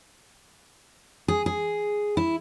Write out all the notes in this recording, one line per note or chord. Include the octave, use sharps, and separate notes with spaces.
G#4
G#4
E4